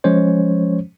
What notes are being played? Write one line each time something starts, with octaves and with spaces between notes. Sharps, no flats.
F3 G#3 C#4 C5 C#5